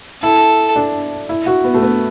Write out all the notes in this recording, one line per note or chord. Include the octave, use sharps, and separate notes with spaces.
E4 A4
D4
E4
F#4
B3
A3
B3